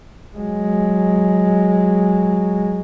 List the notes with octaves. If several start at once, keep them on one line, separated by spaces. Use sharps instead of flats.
F#3 G#3